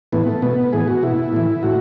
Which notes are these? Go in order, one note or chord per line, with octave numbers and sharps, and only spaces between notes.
A2 E3 B3
A3
B2 B3
A2 E3 G#4
F#4
B2 E4
A2 E3
A2 F#4